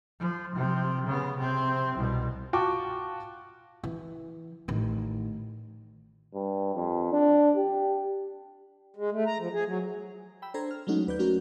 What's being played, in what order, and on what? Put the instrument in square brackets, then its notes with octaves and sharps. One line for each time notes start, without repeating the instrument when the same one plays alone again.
[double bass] F3
C3 F3
C#3 B3
C3 C4
C2 B2
[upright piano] F4 F#4 G5 A5 C#6 D6
[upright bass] E3
A1 D#3
[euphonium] G2
F2
D4
G4
[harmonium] G#3
A3
A#5
F3
G#4
F#3
[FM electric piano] G5 B5 E6
D4 A4 C5 A#5 G#6
F6
F#3 G#3 A3 C#4 D#4 F#4
D#2 B4 D5 G6
F#3 A3 C#4 F#4 A#4